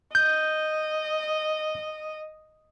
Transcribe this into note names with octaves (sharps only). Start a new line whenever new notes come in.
D#5 G6